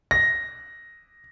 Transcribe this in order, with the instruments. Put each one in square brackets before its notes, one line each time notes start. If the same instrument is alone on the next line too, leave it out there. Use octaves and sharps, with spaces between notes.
[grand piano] A#6